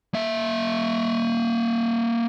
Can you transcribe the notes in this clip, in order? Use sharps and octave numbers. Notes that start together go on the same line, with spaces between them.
A#3 E5